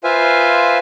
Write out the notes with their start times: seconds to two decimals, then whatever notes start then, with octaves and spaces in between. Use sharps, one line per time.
0.04 F4 B4 C5 E5 F5 G#5